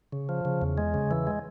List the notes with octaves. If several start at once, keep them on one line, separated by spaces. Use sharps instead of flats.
C#3
F3
C#3
E2
G#3
C#3
E3
G#3